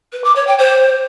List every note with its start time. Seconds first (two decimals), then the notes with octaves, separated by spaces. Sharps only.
0.13 B4
0.24 D6
0.36 C#5
0.47 G5
0.59 C5